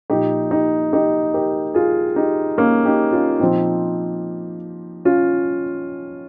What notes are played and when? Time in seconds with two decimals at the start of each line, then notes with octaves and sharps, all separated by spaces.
0.10 A#2 F3 D#4 G4
0.51 D#4 G4
0.93 D#4 G4
1.34 G4 A#4
1.74 F4 G#4
2.16 D#4 G4
2.58 A#3 C#4
2.85 D#4 G4
3.12 C#4 F4
3.40 A#2 F3 C4 D#4
5.05 C#4 F4